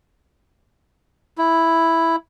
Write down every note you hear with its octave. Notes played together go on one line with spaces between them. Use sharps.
E4